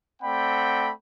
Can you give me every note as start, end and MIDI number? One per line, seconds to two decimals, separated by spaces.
0.23 0.91 57
0.23 0.91 60
0.23 0.91 74
0.23 0.91 78
0.23 0.91 79
0.23 0.91 83